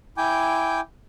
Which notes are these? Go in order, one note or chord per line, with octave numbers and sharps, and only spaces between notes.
E4 G5 G#5 D6 G6